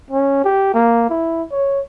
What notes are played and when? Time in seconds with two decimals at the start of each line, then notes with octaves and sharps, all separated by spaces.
0.11 C#4
0.44 G4
0.74 A#3
1.10 E4
1.52 C#5